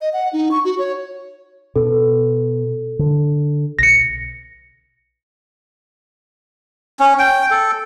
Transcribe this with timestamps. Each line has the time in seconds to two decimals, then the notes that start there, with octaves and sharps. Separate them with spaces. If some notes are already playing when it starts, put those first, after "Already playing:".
0.01 D#5
0.13 F#5
0.33 D#4
0.51 C#6
0.65 F#4
0.78 C#5
1.76 B2 A4
2.99 D3
3.79 B1 A#6 C#7
7.00 C#4
7.19 G5
7.51 A4